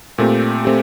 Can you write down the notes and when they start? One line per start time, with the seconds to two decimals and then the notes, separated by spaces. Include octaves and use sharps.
0.18 A#2 A3 C4 G4
0.65 A3 C4 G4